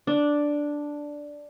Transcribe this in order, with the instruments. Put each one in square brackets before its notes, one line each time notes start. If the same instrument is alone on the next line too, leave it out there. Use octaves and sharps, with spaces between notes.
[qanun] D4